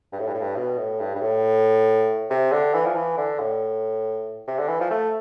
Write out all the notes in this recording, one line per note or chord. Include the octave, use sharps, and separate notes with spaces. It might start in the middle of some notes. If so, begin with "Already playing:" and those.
G2
A2
G2
A2
G2
B2
A2
G2
G2
A2
C3
D3
E3
F3
E3
D3
A2
C3
D3
E3
F3
A3